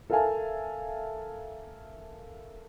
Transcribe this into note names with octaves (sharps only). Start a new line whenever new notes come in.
A4 A#4 E5 F5 G#5 A5